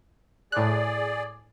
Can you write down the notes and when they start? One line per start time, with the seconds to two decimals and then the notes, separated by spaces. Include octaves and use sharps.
0.52 A2 G#4 D5 F#6